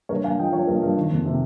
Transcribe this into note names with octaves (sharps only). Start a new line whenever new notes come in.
G2 A#4 C#5
G2 F5 G#5
F3 D#5 G5
F3 C#5 F5
G2 A#4
G2 A#4
D#3
F2
C3